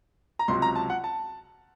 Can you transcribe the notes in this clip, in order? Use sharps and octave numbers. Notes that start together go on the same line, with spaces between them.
A#5
C#2 C3 F#3 C6
A#5
A5
F#5
A5